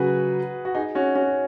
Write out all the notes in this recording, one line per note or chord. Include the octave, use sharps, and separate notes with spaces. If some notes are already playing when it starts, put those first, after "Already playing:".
Already playing: C#3 F#3 F#4 G#4 B4
F#4
D#4 G#4
C#4 F#4
C#4 F#4